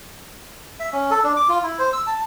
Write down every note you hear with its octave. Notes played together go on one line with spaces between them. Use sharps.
E5
C#4
A4
D4
D6
F4
E4
C5
E6
A5